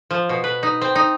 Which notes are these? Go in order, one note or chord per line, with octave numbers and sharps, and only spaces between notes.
F3
B2
B4
D#4
C4
D#4